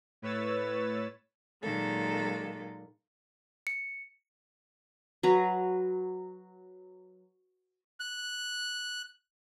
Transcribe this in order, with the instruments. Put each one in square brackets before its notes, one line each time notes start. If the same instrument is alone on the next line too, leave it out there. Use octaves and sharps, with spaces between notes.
[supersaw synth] A2 B4 C#5 E6 A6
[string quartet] A#2 D#3 F#3 G#3 A#3 A4
[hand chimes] C#7
[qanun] F#3 B4 A#5
[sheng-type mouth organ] F#6